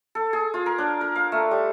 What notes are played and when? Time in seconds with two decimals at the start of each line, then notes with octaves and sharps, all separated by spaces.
0.15 A4
0.33 G#4
0.54 F4
0.66 A#4
0.78 D4
1.01 A#4
1.16 F5
1.32 A3
1.51 G3